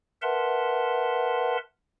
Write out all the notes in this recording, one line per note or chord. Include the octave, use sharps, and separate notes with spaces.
A#4 B4 E5 F#5 A5 C6